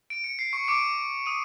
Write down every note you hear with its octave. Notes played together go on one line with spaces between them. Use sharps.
D7
C#7
C7
C#6 C#7
C#7
D6 D7
D#6 D#7